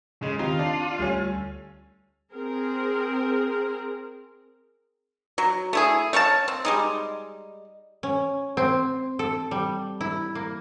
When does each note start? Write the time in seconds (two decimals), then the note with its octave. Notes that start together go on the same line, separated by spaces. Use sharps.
0.23 C#3 G#3
0.39 D#3 C4 D#4 F4 G4
0.59 D4 A5
0.99 D2 G3 A3 C#4
2.33 C4 G#4 A#4
5.38 F#3
5.73 A3 E4 G#4
6.13 A3 C#5 F5 A5
6.48 C4
6.65 G3 G#3 D#4
8.03 C#4
8.57 C4
9.19 A4
9.51 G3
10.01 E4
10.35 A#3